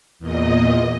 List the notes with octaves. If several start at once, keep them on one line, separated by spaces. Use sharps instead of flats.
E2 A#2 D#5